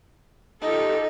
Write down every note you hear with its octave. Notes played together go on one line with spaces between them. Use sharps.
D#4 F4 G4 A4